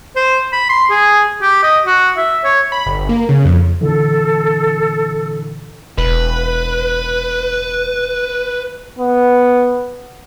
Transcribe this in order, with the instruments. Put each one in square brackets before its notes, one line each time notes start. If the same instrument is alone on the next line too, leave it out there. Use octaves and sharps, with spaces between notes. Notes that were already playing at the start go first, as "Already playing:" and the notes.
[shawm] C5
B5
C6
G#4
G4
D#5
F#4
E5
C#5
[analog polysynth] B5
G1
A#3
C#3
F2
[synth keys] A#2 D3 E3 [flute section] A4
[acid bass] E1 [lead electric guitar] B4
[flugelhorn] B3